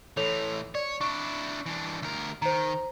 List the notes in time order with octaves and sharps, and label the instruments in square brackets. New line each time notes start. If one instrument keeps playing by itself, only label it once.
[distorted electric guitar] A2 E3 [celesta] A4 C#5 F7
[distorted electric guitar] C#5 [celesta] D5
[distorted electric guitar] D4 E4 [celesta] C#6
[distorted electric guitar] E3 D4
D2 A#4
[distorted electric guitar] D#3 [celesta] C5 A#5